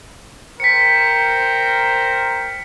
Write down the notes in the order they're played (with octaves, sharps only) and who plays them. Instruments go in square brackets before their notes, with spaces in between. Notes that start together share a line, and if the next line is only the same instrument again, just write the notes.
[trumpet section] A#4 C5 G5 [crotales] B6 C#7